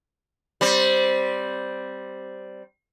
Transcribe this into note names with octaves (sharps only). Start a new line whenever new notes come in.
G3 C4